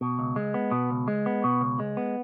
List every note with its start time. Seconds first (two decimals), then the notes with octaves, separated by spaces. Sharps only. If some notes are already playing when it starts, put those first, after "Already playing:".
0.01 B2
0.19 C#2
0.36 G#3
0.54 B3
0.71 B2
0.90 C#2
1.08 G#3
1.26 B3
1.44 B2
1.61 C#2
1.80 G#3
1.97 B3